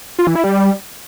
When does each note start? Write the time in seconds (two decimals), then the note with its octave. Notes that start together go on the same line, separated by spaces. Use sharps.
0.19 F4
0.27 E3
0.35 E4
0.44 G3